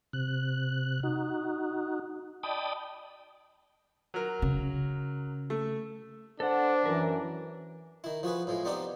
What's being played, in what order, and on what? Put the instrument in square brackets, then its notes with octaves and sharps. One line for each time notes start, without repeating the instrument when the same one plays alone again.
[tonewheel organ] C3 F#6
D#4 F#4
D5 D#5 G5 A5 B5 D#6
[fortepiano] F#3 A#4
[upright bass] C#3
[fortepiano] A3
[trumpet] D4 [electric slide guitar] A4 F#5 [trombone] C5
[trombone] F#2 [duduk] E3 [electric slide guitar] A#4
[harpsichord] D#3 E4
F3 F#4 G#4 B4
A2 F3 G#3
B3 C4 D4 D#4 G4 D5